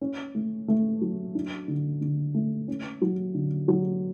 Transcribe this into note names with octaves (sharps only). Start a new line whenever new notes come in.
C#4
A3
A3
F#3
D4
D3
D3
A3
C#4
F#3
D3
F#3